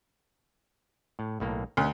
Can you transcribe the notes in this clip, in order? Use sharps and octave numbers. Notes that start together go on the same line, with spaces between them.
A2
B1 A2 A#3
D2 C#4